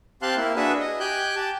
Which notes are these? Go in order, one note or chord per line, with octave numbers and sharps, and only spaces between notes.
C4 G4 F5 A5 C6 F#6
A#3 E4
D4 F#4 G#4 B4 E5
D#5
G4 G5 G#5 F#6 G6
G4 A5